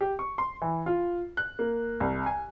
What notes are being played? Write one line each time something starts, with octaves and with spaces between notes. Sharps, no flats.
G4
C#6
C6
E3
F4
F#6
A#3
C2
G#5